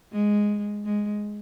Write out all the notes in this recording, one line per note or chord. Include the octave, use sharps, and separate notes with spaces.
G#3
G#3